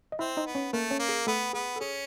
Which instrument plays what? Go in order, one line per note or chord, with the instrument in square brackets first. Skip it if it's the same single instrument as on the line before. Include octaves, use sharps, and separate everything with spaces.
[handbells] D#5
[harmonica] C4 [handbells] E4 E5
[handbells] D#4 D#5
[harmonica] B3
[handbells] C#4 C#5
[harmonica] A3 [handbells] A#3 A#4
[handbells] C#4 C#5
[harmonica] A#3
[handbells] G#4
[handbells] A3 A4 [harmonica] B3
[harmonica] B3 [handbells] G#4
[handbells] A4
[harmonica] C#4 [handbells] G#4